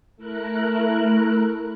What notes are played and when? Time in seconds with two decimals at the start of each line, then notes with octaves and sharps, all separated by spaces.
0.16 A3 E4 A#4 F#6